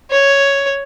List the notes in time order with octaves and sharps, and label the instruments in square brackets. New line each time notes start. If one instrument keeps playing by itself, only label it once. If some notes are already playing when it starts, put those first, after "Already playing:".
[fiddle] C#5